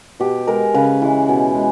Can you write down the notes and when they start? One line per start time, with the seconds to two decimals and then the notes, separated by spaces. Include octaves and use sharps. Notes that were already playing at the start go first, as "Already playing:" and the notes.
0.20 B2 G4
0.47 G#3 A#4
0.74 C#3 B4
1.02 E3 G#3
1.28 B2
1.55 G#3